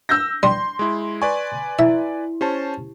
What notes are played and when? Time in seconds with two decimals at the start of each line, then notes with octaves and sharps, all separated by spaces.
0.09 E6 G6 A#6
0.43 G3 C6
0.79 G#3 E4
1.22 B4 D5 G#5 C#6
1.79 E4 E5
2.41 C#4 G4 C5 A5